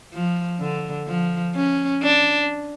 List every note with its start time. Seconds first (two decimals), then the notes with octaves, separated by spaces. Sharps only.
0.14 F3
0.60 D3
1.07 F3
1.56 C#4
2.03 D4